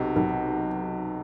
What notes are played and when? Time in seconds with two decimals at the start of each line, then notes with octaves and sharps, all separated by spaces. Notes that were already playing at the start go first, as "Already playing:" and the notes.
Already playing: B1 C3
0.16 B1